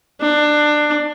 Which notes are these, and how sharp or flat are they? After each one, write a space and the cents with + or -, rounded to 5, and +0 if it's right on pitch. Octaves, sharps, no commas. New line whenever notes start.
D4 +20